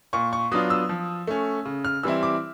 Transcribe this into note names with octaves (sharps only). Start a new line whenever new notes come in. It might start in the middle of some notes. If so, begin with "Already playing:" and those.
A#2 C#6
C#6
F#3 B3 D4 F4 D#6
E6
F3
A3 C#4
C#3
F6
E3 G3 C4 E4 E6
D6